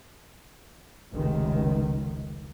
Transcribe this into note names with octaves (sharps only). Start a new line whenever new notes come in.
F1 C#2 D#3